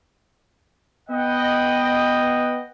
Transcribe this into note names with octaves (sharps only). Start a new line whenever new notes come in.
B3 D#5 F#5 G5